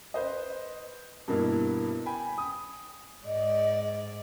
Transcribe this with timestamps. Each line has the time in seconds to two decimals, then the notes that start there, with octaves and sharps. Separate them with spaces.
0.14 B4 C5 D#5
1.28 G2 B2 A#3 B3 E4
2.06 G5 G#5 B5
2.38 D#6
3.25 G#2 D5 D#5